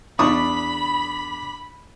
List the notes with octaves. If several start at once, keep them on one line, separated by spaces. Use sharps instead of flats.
E2 D4 B5 C#6 D#6